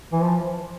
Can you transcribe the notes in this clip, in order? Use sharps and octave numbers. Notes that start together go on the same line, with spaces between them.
E3
F3